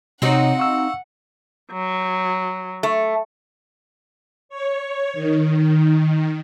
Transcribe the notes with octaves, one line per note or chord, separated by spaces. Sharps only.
C3 C4 D#4 F#4 C#5 F#5
F5 C#6 E6
F#3
A3
C#5
D#3